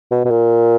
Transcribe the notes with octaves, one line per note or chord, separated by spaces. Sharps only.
B2
B2
A#2